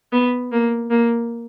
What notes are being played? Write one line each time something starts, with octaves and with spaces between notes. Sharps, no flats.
B3
A#3
A#3